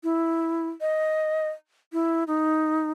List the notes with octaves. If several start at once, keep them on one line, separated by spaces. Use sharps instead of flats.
E4
D#5
E4
D#4